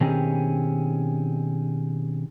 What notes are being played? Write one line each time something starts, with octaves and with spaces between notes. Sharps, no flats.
B2 D#3 C4 C#4 G4 G#4